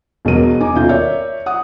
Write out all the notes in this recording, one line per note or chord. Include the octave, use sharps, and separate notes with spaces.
E1 B2 F#3 A#4 D#7
D#4 G#5 D6
D#1 B2 C#4 F4 E5 G6
A#4 C#5 D5 E5
F#5 D#6